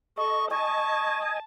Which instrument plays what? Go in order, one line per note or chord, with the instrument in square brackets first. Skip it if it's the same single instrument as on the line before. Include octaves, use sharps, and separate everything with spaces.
[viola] A4 [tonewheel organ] D#5 [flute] C#6
[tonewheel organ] D#5 G#5 [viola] A5 [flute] C#6